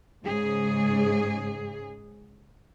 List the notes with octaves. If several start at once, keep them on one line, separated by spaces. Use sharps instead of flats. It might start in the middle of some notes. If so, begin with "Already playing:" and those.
G#2 C#3 G#4